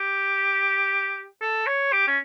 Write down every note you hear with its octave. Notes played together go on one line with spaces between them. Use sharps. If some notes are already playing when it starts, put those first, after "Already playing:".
Already playing: G4
A4
C#5
G4
C#4